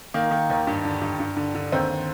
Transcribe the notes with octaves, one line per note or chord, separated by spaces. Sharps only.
D#3 A#3
D#3
D#2
G2
D3
G2
G2
D3
D3
D#2 C4